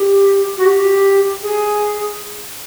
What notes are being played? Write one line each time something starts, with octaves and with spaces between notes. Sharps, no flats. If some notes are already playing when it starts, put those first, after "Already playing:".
Already playing: G4
F#4
G4
G#4